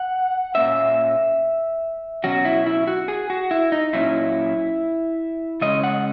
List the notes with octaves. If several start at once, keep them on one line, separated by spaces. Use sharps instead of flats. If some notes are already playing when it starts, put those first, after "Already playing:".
Already playing: F#5
A#2 A#3 C#4 E5
B2 F#3 C#4 F#4
E4
E4
F#4
G#4
F#4
E4
D#4
A#2 F#3 C#4 E4
C#3 G#3 C#4 D#5
F#5